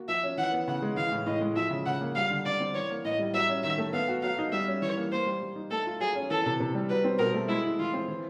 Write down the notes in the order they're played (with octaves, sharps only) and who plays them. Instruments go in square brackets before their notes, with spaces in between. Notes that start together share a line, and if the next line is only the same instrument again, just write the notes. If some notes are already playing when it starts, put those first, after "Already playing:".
Already playing: [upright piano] A#3 F#4
[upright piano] F3 [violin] E5
[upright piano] C#4
[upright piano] E3 [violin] F#5
[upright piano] B3
[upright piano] C#3 [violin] F#5
[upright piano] G#3
[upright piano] E3 [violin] F5
[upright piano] A2
[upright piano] A2 [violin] D#5
[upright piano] G#3
[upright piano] F3 [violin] E5
[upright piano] C#3
[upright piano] C#3 [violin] F#5
[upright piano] A#3
[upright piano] G3 [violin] F5
[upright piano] D3
[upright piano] D3 [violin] D5
[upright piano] C4
[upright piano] E3 [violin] C#5
[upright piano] A#3
[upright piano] A2 [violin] D#5
[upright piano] G3
[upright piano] F#3 [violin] E5
[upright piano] C#4
[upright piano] D#3 [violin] E5
[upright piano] A3
[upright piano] B3 [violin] F5
[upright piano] F#4
[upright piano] F#3 [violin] F5
[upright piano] D#4
[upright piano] G3 [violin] E5
[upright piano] C#4
[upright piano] E3 [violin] C#5
[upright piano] A#3
[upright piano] A#3 [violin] C5
[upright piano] G3
G3
D#4
[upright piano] A3 [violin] A4
[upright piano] F4
[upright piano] F#3 [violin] G#4
[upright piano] C#4
[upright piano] E3 [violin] A4
[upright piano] C3
C3
G3
[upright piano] F#3 [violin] B4
[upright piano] C4
[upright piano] B2 [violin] A#4
[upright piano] A3
[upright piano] G#3 [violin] E4
[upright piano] E4
[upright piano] E3 [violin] F4
[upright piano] C4
E3